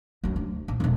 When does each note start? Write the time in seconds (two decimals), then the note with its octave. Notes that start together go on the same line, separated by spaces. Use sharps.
0.24 F#2 F#3
0.36 D2
0.68 A#1
0.80 E1 A#1